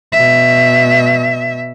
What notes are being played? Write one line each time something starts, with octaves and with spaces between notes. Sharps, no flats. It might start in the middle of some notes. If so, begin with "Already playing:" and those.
B2 E5